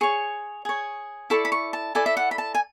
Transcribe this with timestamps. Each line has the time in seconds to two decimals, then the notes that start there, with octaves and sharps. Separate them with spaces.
0.01 G#4 C#5 C#6
0.65 G#4 C#5
1.30 E4 A4 D5 C#6
1.45 B5
1.52 C#6
1.73 A5
1.95 E4 A4 D5 G#5
2.06 E5
2.17 F#5
2.31 B5
2.38 A5
2.55 G#5